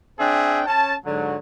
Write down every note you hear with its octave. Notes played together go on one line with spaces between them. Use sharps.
C4 D4 G#4 E5 G5
C#4 A5
G#2 D3 F#3